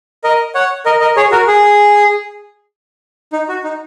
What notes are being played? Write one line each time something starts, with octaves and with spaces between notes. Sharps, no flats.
A#4 D#5
C#5 F#5
A#4 D#5
A#4 D#5
G#4 C#5
F#4 A#4
G#4
D#4
F#4
D#4